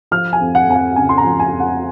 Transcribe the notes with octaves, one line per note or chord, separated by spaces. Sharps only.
F3 F6
G#5
F2
F#5
F2 G#5
F#5
C#3 G#5
C6
A#5
F3
G#5
F2
F#5